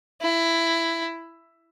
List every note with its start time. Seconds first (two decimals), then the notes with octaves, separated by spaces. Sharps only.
0.22 E4